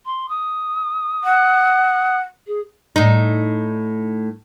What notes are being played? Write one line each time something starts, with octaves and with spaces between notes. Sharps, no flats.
C6
D#6
F#5
G#4
A2 D#4